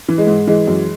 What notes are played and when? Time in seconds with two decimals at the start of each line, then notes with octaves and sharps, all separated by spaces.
0.08 E3
0.18 G#3
0.27 G#2
0.47 E3 G#3
0.67 F#2